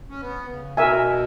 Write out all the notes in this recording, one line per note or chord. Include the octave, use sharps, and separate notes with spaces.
C#4
B3
C#3
B2 A#4 E5 G#5